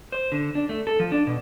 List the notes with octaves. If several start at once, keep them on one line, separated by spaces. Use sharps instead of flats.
C5
D3
D4
A3
A4
F3
D4
B2